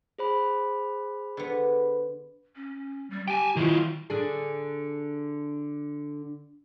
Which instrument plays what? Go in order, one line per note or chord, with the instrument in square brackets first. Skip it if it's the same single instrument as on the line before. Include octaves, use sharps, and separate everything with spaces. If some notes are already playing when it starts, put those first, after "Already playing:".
[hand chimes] G#4 C5 B5
[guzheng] D3 B3
[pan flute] C#4
G3
[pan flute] G4 [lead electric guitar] G5 G#5
[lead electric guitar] D#3 F4 [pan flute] E4
[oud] D3 D4 G#4